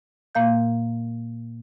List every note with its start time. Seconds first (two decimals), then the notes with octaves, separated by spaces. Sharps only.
0.35 A#2 A#3 F5 G6